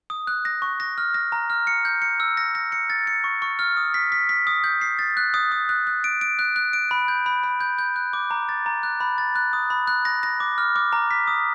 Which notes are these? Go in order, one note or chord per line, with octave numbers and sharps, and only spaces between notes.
D#6
F#6
A#6
C#6
A#6
F6
A#6
A#5
F6
C#7
G6
C#7
E6
A#6
A#6
C#7
A6
C#7
C#6
C#6
F6
D#6
B6
B6
B6
D#6
G6
C7
A6
F#6
D#6
D#6
F#6
F#6
D7
D7
F#6
F#6
D7
B5
G6
B5
B5
G6
G6
F#6
D6
A#5
A6
A#5
F#6
B5
A6
F#6
D#6
B5
F#6
A#6
A#6
D6
F6
D6
A#5
B6
D#6